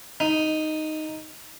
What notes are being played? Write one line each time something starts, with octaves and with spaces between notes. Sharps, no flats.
D#4